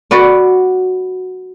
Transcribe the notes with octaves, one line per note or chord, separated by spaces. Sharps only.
F#4 B4 D5